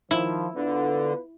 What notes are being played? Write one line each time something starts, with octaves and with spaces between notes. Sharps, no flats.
D#3 F3 E4
D3 B3 F4 B4